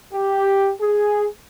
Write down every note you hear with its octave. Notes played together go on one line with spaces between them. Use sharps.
G4
G#4